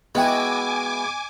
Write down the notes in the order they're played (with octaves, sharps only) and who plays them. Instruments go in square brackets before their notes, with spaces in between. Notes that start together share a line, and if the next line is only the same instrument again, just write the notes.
[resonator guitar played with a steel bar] G#3 [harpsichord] B3 E4 F#4 [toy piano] G5 C6 [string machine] G#5 D6